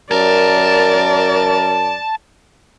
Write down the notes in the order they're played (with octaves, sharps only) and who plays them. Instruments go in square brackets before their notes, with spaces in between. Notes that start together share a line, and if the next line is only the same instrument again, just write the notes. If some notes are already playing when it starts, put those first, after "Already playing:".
[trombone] F#2 [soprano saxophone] A#4 [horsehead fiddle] D5 [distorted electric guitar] A5